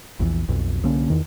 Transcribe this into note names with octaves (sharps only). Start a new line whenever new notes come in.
A#1 E2 D3 E3
B1 F2 B2
C2 D3 A#3 C#4
E2 D#3